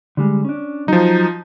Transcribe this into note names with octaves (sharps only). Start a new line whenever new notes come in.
D3 G3 G#3
C#4 D4
F3 F#3 D#4